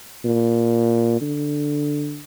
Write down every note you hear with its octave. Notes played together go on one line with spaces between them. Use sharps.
A#2
D3